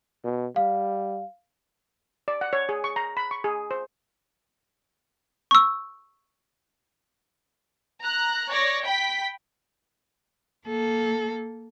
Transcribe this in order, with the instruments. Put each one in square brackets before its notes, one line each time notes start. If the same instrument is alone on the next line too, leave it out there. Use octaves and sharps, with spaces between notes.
[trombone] B2
[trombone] G3 [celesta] F5
[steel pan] D5
F#5
C#5
G#4
C#6
A#5
B5
C#6
G#4
C5
[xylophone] C#6 E6
[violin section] A#5 F#6
C#5 D5 A#6
G5 B5 B6
[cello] A#3 A4